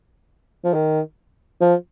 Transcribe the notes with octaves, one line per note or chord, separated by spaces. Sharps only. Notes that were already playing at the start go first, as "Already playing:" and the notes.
F3
D#3
F3